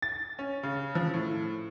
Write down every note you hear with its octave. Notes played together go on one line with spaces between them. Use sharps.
A6
C#4
C#3
F3
A2